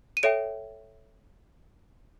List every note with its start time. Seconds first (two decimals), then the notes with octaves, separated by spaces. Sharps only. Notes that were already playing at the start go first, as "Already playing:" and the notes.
0.17 D#7
0.23 A4 C#5 E5 G5 D7